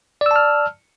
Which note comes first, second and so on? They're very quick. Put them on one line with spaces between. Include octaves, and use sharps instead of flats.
D5 E6 A5 F6